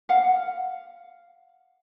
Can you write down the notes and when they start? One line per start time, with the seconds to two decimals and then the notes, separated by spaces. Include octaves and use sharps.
0.09 F5 F#5